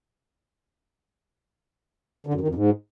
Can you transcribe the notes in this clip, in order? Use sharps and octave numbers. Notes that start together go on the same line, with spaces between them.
D3
F#2
D#3
F2
G#2